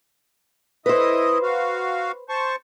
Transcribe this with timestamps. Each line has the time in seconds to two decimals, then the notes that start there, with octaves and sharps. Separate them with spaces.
0.86 E4 B4 C5 D#5 D#6
1.43 F#4 F5
2.29 C5 A5 C#6